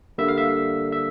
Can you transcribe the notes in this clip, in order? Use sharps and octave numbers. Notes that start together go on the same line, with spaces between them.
D3 G3 A#3 E5
F5
E5
E5